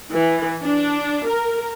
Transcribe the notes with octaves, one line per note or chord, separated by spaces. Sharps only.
E3
D4
A#4